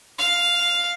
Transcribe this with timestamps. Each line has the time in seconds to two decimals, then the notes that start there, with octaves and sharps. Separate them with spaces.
0.18 F5